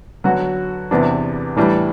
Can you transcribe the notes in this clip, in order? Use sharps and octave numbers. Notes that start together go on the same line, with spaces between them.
D3 F#3 B3 F#4
E2 C3 E3 B3 D4
A2 E3 G3 D4